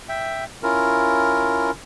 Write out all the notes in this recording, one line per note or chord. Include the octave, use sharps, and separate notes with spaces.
E5 G5
C#4 E4 F4 A#4